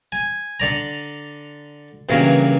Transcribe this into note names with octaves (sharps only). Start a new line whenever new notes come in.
G#5
D3 D5 A#5
G2 A#2 C#3 E3 F#3 A#4